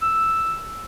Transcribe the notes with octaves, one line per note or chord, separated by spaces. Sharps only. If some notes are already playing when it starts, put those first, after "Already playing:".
E6